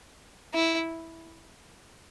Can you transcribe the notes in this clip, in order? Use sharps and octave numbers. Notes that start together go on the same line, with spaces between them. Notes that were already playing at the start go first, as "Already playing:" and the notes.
E4